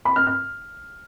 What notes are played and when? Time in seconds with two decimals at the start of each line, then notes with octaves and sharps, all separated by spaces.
0.05 B5
0.16 F6
0.27 F6